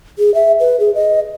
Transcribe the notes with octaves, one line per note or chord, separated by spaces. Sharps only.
G#4
E5
B4
G#4
D#5